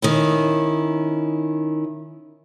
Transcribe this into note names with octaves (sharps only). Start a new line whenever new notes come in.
D#3 C#4 E4